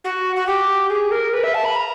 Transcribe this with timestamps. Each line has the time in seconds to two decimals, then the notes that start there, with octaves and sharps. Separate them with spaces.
0.04 F#4
0.35 F#4
0.47 G4
0.90 G#4
1.11 A#4
1.33 B4
1.43 E5
1.54 A5
1.64 B5
1.75 A#5